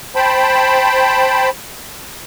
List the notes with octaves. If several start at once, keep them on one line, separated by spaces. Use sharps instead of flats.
C5 G5 A5 B5